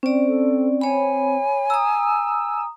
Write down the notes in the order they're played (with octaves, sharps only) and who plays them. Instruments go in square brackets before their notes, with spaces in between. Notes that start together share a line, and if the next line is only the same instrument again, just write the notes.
[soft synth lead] C4 [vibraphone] C#4 D5
[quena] A4
[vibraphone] C#5 B5 [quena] G#5
[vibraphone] A#5 D#6 [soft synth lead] E6